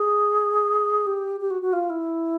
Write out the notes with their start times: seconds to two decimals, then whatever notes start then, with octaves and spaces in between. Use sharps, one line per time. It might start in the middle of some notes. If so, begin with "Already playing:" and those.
Already playing: G#4
1.07 G4
1.40 G4
1.51 F#4
1.62 F#4
1.73 F4
1.90 E4